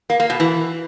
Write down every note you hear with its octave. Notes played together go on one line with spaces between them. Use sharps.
A#3
A#3
B2
E3